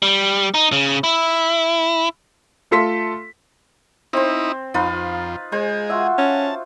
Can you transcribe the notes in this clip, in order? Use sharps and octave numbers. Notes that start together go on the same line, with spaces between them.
G3
D#4
C#3
E4
A3 F4 A4 C6 B6
C4 D#4 E4 C5
F2 D#4 F4 B4
G#3 G#4 C5
F4 F#4 E5
C#4 A5